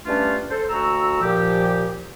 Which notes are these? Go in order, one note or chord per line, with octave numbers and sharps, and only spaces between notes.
G3 A3 C#4 D4 F4 B4
A4 C5
D2 F#4 A#5 E6
A#2 F3 G4